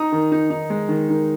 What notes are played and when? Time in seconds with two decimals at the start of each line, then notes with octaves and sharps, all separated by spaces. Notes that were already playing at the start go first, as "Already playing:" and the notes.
Already playing: D#4 A#5 D#6
0.12 D#3
0.32 D#4
0.50 D#4
0.70 G#3
0.89 D#3
1.09 D#3